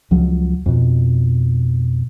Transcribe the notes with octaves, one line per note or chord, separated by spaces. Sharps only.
C#2 F3 F#3
F2 B2